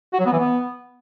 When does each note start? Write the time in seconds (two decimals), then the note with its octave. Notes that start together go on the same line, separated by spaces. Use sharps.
0.13 F#4
0.20 F#3
0.26 B3
0.32 E3
0.39 B3